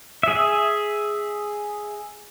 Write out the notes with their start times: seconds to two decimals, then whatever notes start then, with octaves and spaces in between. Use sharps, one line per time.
0.23 G#4 E5